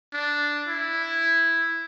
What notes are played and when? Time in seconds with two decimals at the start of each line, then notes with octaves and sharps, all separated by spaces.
0.14 D4
0.68 E4